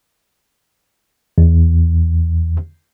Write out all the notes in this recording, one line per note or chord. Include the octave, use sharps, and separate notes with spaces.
E2